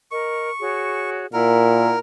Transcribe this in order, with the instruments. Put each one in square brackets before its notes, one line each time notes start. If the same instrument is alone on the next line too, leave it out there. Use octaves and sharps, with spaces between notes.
[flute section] A#4 D#5 [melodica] C#6
[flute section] F#4 G#4 C#5
[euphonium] A#2 [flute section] E4 F#5 [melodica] A#4